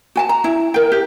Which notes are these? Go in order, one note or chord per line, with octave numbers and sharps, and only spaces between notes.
F#4 G#5 A5
A#5
E4
A#4 G5
G4